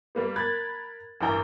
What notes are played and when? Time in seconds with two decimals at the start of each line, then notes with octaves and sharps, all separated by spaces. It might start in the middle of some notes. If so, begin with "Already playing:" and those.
0.15 G3 A#3 B3
0.36 A#4 B5 F#6 G#6 A6
1.21 A1 G2 E4 A#4 G5 A#5